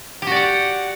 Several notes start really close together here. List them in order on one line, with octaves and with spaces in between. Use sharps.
G4 F#4 D5 F#5